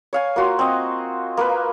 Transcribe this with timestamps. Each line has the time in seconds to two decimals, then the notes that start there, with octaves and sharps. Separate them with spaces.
0.13 C#5 F5 G#5
0.36 A#3 F4 F#4 C6
0.59 C4 D#5
1.37 A#3 A#4 B4